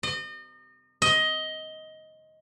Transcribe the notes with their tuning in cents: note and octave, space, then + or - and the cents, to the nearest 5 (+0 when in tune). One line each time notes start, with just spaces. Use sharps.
D#5 -35
D#5 +15